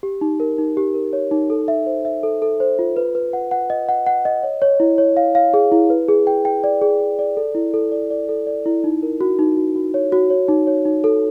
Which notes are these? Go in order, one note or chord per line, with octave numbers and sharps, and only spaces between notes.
G4
D#4
A#4
D#4
G4
A#4
C#5
D#4
A4
E5
C5
E5
A4
A4
C5
F4
B4
B4
F#5
F#5
D#5
F#5
F#5
D#5
C#5
C#5
E4
C#5
F5
F5
G#4
E4
B4
G#4
G5
G5
D5
G#4
G#4
D5
A4
E4
A4
D5
D5
A4
D5
E4
D#4
A#4
F#4
D#4
F#4
F#4
C#5
F#4
C#5
D#4
C#5
D#4
A4